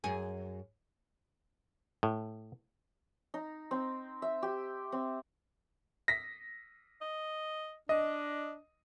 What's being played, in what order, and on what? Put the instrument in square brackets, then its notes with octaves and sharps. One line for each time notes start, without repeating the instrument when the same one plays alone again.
[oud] F#2 G#4
[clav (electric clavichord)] A2
[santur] D#4
C4
E5
G4
C4
[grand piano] A#6 B6
[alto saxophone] D#5
[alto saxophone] D4 [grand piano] D#5